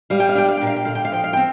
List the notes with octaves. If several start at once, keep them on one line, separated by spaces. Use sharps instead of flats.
G3 F5
G5
F5
D4 G5
F5
A#2 G5
F5
G5
D3 F5
G5
F5
F3 G5
F5
G5
C4